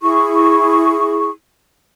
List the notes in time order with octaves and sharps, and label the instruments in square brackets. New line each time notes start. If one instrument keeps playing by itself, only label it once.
[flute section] E4 G#4 C#6